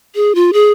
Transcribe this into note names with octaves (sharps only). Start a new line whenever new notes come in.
G#4
F4
G#4